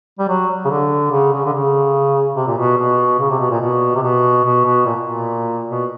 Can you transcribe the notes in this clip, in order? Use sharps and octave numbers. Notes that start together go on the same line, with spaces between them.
G3
F#3
C#3
D3
C#3
C#3
D3
C#3
C3
A#2
B2
B2
C#3
C3
B2
A#2
B2
C3
B2
B2
B2
A#2
A#2
B2